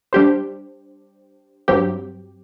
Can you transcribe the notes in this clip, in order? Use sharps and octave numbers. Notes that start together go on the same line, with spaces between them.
G3 D4 G4 C5
G2 F#3 C4 G4